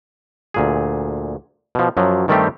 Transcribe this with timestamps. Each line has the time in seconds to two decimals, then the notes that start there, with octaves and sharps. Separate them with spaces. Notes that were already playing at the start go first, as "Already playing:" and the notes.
0.54 D2 A#2 G#4
1.75 B2 F3
1.97 F#2 F3 F#3
2.28 G2 D#3 G3 A3 C4 G4